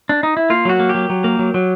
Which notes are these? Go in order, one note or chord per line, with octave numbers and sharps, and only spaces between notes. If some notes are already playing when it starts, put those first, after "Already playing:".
D4
D#4
E4
A#3 F4
F#3 F#4
A#3
G4
F#3
F#3
A#3
F#3
F#3